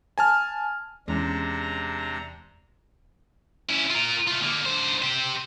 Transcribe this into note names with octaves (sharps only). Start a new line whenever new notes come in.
G#5 A5 F6
E2 C3 G#3 C#4 D4 A#5
C#4 E4
F4 A#4
A3 F4
D3 A#3
D3 C5
G4 C5